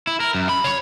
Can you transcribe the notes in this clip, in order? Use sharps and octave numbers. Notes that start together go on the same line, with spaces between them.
E4
A#4
F#2
B5
C#5